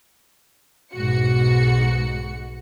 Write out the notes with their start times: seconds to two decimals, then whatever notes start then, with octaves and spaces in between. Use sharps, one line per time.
0.93 B1 G#2 F#4 C#7